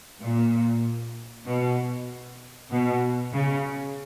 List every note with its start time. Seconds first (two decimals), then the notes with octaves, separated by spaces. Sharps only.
0.21 A#2
1.46 B2
2.70 B2
3.33 C#3